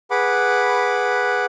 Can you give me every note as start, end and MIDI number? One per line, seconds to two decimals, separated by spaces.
0.11 1.46 68
0.11 1.46 71
0.11 1.46 78
0.11 1.46 83
0.11 1.46 86